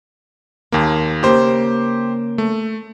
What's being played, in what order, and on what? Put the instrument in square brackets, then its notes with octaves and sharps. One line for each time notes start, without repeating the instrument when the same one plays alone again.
[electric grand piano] D#2 A#3 [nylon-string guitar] G#3
[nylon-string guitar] C#3 A#3 D#5 [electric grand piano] G4 C5
[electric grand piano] A3